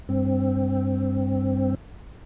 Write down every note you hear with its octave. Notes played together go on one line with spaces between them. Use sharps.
G2 C4